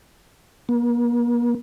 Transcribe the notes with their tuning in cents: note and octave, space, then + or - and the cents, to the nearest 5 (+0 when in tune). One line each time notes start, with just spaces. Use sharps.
A#3 +40